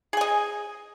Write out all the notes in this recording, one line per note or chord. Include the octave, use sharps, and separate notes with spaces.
G#4 D#5 G#5